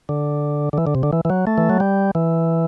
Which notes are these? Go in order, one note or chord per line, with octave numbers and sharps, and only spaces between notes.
D3
D3
E3
D3
C3
D3
E3
E3
F#3
A3
E3
F#3
G3
E3